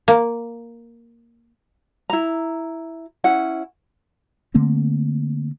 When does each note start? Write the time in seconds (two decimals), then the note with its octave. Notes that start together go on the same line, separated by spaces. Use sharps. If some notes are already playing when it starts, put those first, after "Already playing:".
0.08 A#3
2.10 E4 A#5
3.24 C#4 E4 F#5
4.54 D3 A3 A#3 C4